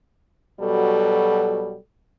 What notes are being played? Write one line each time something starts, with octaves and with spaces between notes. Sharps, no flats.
B2 F#3 G3 A4